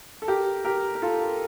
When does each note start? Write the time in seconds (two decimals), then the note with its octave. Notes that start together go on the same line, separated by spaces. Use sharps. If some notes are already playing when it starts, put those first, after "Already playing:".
0.22 A4
0.28 G4 A#4
0.65 G4 A#4
0.95 A#4
1.02 F4 A4